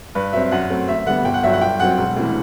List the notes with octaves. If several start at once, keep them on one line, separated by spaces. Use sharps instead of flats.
G2 B4
F#3 C4 E5
F#2 F#5
F#3 A3 C4
D2 E5
D3 G3 B3 F#5
G1 G5
F#5
G2 F#3 E5
F#5
G1 G5
F#2 F#3 C4 F#5
E1
D2 C3 E3